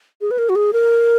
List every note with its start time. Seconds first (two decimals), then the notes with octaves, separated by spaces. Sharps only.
0.21 G#4
0.31 B4
0.38 A#4
0.49 F#4
0.56 G#4
0.73 A#4